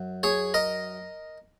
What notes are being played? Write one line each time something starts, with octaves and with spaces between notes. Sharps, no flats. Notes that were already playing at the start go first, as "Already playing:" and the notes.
Already playing: F#2
G#4 C#5
A#4 D#5